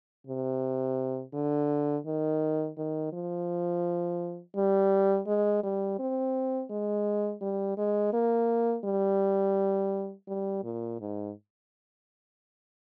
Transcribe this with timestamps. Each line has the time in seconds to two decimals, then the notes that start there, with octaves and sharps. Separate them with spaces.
0.27 C3
1.34 D3
2.06 D#3
2.78 D#3
3.13 F3
4.57 G3
5.27 G#3
5.64 G3
5.99 C4
6.70 G#3
7.41 G3
7.78 G#3
8.13 A#3
8.85 G3
10.28 G3
10.64 A#2
11.00 G#2